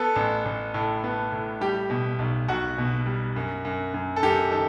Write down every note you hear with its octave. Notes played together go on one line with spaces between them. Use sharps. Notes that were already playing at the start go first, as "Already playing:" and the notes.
Already playing: B3 A4
A1
A1
A2
B3
A2
G3 G4
B2
B1
B1 F#4
B2
G3
F#2
F#2
F#2
A4
F#2 G4
D#3 A4